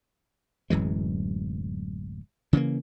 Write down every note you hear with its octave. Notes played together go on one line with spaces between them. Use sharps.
D1 F#2 E3 G#3
C#3 E3 F#3 A#3